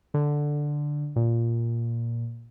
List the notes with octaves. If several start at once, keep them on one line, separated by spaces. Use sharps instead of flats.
D3
A#2